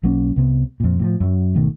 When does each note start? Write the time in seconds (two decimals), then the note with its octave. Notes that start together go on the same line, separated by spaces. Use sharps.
0.03 B1 F#3 A#3 C#4
0.36 C2 C3 B3
0.80 F2 A#2
0.99 A2 E3 F3
1.20 F#2 F#3
1.55 G#1 B2 D#3 A3